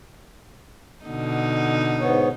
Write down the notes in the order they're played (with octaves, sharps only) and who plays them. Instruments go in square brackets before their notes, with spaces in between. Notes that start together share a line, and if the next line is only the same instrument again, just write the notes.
[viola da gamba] B2 D3 D#4
[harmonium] G#2 B3 C#5